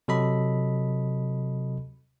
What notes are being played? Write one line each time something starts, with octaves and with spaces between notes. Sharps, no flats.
C3 F#3 A4 D#5 B5